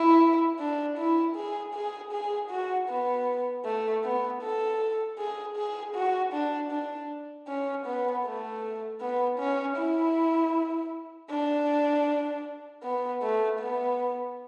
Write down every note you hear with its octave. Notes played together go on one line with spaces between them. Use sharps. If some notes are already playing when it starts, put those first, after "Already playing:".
Already playing: E4
D4
E4
G#4
G#4
G#4
F#4
B3
A3
B3
A4
G#4
G#4
F#4
D4
D4
C#4
B3
A3
B3
C#4
E4
D4
B3
A3
B3